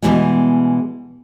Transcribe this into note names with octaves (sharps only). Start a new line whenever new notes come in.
B2 D3 E3 G3 G#3